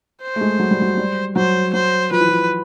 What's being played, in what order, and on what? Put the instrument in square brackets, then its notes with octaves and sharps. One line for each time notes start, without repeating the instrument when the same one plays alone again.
[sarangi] C5
[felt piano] A3
G#3
F#3
G3
F#3
G3
[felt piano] F#3 [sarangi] C5
[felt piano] F#3 [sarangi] C5
[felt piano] F3 [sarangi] B4
[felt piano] E3
F3